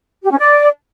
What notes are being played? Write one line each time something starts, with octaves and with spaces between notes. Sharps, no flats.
G4
C#4
D5